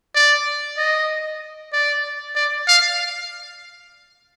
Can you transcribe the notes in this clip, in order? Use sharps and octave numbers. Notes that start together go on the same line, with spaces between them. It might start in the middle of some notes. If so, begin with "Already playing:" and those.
D5
D#5
D5
D5
F5